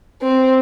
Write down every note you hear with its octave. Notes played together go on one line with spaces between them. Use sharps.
C4